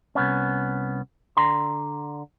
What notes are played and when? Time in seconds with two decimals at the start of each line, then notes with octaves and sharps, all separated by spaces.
0.15 C2 B3 C#4
1.37 D3 A#5 C6